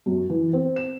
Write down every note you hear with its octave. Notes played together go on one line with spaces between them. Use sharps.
F#2
E3
C4
E7